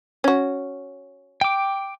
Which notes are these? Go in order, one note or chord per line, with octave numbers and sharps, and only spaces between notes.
C#4 F#4
G5 D6